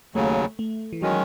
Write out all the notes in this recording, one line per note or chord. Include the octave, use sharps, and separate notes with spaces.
D#2 C#3 F#3 A3
A3
E3
D#3 F#3 G#3 C#4